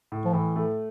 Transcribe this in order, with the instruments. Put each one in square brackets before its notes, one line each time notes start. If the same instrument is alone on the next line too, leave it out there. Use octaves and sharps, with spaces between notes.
[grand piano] A2
[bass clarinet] F3
[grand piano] A2 [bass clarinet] E3
[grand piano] A3